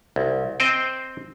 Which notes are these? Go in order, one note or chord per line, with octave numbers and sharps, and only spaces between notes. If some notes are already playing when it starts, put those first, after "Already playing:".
C2
C4 C5 D#5 G5